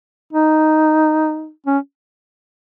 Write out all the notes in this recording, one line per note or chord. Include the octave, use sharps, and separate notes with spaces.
D#4
C#4